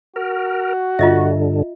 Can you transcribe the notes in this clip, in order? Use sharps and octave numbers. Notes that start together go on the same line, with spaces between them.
F#4 A#4
G2 D3 F4 D#5 E5